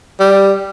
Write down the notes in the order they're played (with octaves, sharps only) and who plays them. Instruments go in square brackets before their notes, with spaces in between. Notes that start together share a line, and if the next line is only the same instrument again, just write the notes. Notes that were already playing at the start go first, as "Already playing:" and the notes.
[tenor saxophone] G3